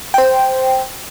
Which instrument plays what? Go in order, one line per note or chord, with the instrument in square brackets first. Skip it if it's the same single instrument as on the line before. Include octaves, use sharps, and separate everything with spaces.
[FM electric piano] C5 G5